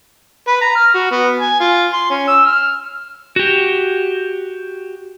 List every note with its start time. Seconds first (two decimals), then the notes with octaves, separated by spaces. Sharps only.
0.48 B4
0.61 A#5
0.76 F6
0.95 F#4
1.11 B3
1.40 G#5
1.60 F4
1.93 C6
2.10 C#4
2.28 E6
2.46 F6
3.36 F#4 G4